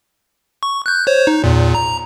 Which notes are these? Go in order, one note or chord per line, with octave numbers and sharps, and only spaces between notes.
C#6
F#6 G6
C5 C#5
D#4
E2 A#2
A#5